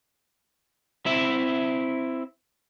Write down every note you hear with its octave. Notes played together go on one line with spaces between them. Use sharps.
C4 E4 E5